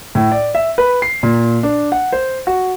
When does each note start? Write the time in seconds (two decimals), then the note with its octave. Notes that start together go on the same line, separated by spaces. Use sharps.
0.15 A2
0.32 D5
0.55 E5
0.78 B4
1.02 C7
1.23 A#2
1.63 D4
1.92 F#5
2.13 C5
2.47 F#4